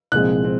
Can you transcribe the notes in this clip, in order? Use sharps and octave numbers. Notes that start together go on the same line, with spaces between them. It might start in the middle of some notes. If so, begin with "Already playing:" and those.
C2 A#2 F3 G#3 C4 F#6
C4